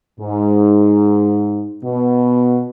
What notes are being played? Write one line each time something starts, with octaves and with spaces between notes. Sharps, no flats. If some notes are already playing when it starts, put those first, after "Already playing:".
G#2
B2